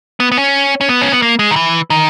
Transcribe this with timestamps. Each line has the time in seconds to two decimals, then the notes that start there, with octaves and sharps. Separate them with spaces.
0.20 B3
0.32 B3
0.37 C#4
0.81 C#4
0.89 B3
1.02 C#4
1.12 B3
1.22 A#3
1.39 G#3
1.51 D#3
1.56 E3
1.90 D#3